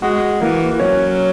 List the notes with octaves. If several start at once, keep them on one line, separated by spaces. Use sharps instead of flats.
G#3 F#4
E3 A#3
E3
F#3 C#4